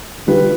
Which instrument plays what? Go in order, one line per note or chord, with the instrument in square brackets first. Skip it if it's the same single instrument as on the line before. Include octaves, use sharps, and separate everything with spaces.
[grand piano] D3 G3 D4 F4 B4